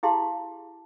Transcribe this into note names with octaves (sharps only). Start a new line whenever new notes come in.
E4 G4 G#4 F5 A5 C6